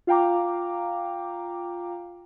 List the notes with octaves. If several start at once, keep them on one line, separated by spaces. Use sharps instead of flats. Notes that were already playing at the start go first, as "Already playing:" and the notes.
F4 F5 G5 A#5 D6